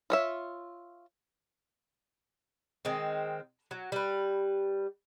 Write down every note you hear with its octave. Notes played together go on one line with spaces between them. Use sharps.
F4 C#5 E5
D#3 G#3 C4
F#3
G3 B4